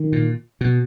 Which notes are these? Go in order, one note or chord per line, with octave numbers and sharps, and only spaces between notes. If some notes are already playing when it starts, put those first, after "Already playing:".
Already playing: D#3
A#2
B2